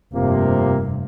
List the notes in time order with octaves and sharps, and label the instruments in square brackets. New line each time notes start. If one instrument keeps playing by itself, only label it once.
[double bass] F1 G2 [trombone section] C3 F3 A#3